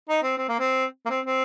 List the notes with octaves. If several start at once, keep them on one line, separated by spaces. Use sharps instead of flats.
D#4
C4
C4
A#3
C4
A#3
C4
C4